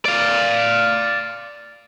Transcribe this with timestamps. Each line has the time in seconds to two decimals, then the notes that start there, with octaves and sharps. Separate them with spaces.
0.05 D5 F5